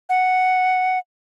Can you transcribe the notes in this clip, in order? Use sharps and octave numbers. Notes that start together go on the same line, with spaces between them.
F#5